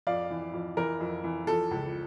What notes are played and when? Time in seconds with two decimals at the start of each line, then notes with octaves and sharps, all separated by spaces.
0.07 F2 D5 F5
0.30 E3
0.53 F2
0.77 E3 A#4
1.00 F2
1.24 E3
1.47 F3 A4
1.71 C#2